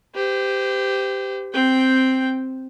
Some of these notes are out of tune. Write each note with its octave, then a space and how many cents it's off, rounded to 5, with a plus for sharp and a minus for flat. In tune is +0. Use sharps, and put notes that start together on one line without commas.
G4 +0 C5 -40
C4 +0 G5 +0